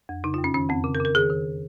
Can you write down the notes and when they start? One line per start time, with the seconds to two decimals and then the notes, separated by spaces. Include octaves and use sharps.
0.09 F2
0.24 C#3 D#4
0.34 F#2 F4
0.44 C#4
0.54 D#3 C#4
0.69 F2 C4
0.84 C#3
0.95 A#4
1.00 C#3
1.05 A#4
1.15 D#3 G#4
1.30 D#3